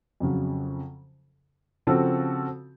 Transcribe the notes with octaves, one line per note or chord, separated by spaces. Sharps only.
F2 C#3 F#3
C#3 F3 C4 F#4 A4